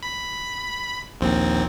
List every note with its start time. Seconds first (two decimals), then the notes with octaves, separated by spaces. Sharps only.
0.03 B5
1.21 A#1 D#2 C4